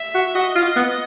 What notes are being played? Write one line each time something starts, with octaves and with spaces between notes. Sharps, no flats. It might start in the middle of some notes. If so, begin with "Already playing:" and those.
Already playing: E5
F#4
F#4 D#5
F4
B3